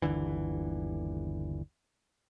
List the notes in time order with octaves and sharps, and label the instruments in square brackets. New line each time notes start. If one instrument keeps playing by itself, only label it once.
[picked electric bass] G1 D#2 D3 E3